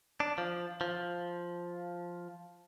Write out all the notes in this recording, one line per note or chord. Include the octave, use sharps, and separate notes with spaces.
D4
F3
F3